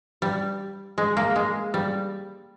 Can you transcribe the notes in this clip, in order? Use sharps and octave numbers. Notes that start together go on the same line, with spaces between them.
G3
G#3
A#3
G#3
G3